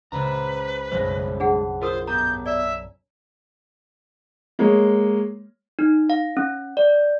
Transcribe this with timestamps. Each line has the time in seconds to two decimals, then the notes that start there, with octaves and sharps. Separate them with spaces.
0.12 C#2 B4 C5 A#5
0.92 B1 F#2 G3 G#3 C#4 C5 A#6
1.40 D4 G#4 F#5 A5
1.82 F4 F#4 A#4 C5 D#6
2.07 B3 G4 A#5 D#6 G6
2.46 D5 E5
4.59 G#3 A#3 C#5
5.79 D#4
6.10 F5
6.37 C#4
6.77 D5